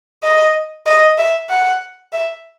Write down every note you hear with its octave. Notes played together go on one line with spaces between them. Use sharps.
D#5
D#5
E5
F#5
E5